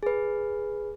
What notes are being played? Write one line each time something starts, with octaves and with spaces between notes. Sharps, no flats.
G#4 B4